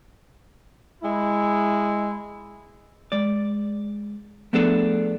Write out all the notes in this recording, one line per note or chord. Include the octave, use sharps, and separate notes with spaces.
G#3 E4
G#3 D5
F3 A3 B3 D4 G#4 A4